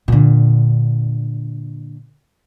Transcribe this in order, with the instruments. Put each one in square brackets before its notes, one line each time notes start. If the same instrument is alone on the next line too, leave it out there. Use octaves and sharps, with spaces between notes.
[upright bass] A#2 D3